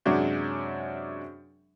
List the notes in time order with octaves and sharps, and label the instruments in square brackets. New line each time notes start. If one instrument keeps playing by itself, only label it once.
[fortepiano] F#2 C3 F#3 G#3 D4 F#4